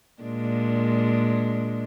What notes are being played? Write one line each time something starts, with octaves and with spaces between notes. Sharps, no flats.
A#2 G#3 D4